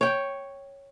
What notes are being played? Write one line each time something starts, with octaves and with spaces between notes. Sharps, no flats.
C#5 G5